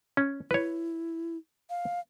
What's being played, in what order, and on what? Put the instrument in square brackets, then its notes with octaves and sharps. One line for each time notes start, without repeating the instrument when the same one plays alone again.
[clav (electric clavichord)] C#4
[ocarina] E4 [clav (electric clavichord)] B4 C#5
[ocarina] F5